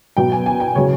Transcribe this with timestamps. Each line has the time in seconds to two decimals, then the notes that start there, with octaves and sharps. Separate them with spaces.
0.17 B2 F#3 G5
0.32 G#5
0.46 G#5
0.60 G5
0.75 C#3 F#3 C#5